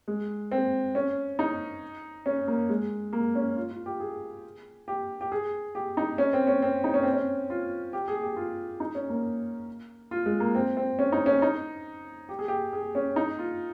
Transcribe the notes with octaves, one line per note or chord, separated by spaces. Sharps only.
G#3
C4
C#4
D#4
C#4
A#3
G#3
A#3
C#4
F4
F4
G4
G#4
G4
G4
G#4
G4
D#4
C#4
C4
C#4
C4
D#4
C#4
C4
C#4
F4
G4
G#4
G4
F4
D#4
C#4
A#3
F4
G#3
A#3
C4
C4
C#4
D#4
C#4
D#4
G4
G#4
G4
G#4
C#4
D#4
F4